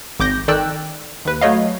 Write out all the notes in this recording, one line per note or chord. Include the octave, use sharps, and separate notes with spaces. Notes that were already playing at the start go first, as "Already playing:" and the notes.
G#1 D6 G6 A#6
D#3 A4 D5 G5 E6 F#6
D#2 B4
F#3 A3 C#5 D#5 F5